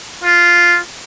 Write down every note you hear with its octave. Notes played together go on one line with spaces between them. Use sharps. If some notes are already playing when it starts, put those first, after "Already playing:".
F4